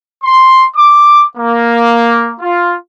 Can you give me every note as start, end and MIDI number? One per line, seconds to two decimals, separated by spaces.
0.23 0.64 84
0.76 1.24 86
1.38 2.34 58
2.41 2.75 65